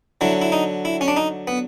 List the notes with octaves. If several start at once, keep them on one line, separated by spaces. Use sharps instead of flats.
D3 F#3 E4
E4
D#4
E4
C#4
D4
D#4
B3